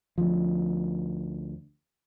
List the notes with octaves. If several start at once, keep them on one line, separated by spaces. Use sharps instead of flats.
D2 F3